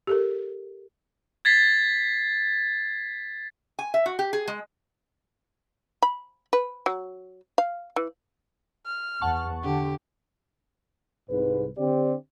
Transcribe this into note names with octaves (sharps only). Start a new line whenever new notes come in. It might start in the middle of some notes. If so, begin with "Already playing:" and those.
G4 A4 A#4
G#6 A6 B6 C7
G#5
E5
F#4
G4
G#4
G#3
B5
B4
F#3
F5
E3
F6
E2 F#5 A5 C#6
D3 G4
C2 G#2 B4
D3 C4 G4 D5